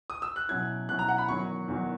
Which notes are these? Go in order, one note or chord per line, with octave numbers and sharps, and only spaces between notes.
D#6
E6
F#6
B2 F#3 C#4 E4 G#6
B2 F#3 C#4 E4 F#6
A#5
F#5
B5
E2 D#3 F#3 C#6
E2 D#3 F#3